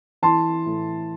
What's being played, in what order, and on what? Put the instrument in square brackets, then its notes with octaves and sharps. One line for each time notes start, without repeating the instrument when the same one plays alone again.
[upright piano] E3 A5 C6
A2